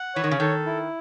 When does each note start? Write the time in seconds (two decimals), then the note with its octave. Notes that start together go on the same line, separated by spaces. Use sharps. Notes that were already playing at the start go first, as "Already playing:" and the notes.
Already playing: F#5
0.15 E3 C#5
0.24 D#3
0.31 C#3
0.40 D#3 A4
0.66 E4